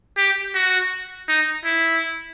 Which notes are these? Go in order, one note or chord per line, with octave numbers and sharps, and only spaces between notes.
G4
F#4
D#4
E4